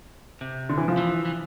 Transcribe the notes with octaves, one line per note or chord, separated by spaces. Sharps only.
C3
D3
E3
F3
E3
E3